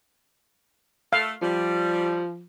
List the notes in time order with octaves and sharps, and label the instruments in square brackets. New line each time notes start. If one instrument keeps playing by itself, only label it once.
[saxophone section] A3 A4 [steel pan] F5
[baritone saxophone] F3 [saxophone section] G3